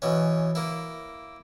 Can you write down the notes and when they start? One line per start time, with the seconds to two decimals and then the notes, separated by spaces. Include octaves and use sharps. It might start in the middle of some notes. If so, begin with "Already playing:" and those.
0.02 B2 E3 C#4
0.55 A#3 E4